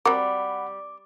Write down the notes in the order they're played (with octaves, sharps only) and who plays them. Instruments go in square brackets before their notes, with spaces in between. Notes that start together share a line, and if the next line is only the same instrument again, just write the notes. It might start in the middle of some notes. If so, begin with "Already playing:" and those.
[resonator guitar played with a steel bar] G3 [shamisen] C4 F#4 A#4 [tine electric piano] F#5 B5 [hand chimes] D6